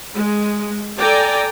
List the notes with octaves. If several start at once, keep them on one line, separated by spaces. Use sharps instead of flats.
G#3
A4 D5 G5 G#5 A#5